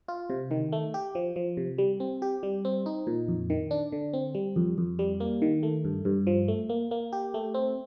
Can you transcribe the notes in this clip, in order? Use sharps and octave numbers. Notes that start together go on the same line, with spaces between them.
F4
C3
D#3
A3
G4
F3
F3
C3
G3
C4
G4
G3
C4
D#4
A#2
F2
D#3
D4
D3
C4
G3
F2
F2
G3
A#3
D#3
A3
G2
G2
F3
A3
A#3
A#3
G4
A3
C4